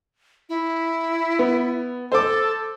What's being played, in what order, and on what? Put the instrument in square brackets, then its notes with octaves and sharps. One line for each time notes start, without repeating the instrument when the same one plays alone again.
[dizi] E4
[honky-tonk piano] B3
[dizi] A4 [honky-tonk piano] C5 D6